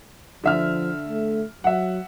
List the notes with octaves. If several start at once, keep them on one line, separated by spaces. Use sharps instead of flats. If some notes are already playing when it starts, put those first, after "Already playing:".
D3 F3 E5 F6
A3
F#3 E5 F#5